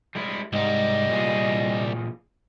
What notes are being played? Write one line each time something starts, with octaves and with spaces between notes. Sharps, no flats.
G3 G#3 E4
C2 G#2 G3 D#5
A#2 E3 G#4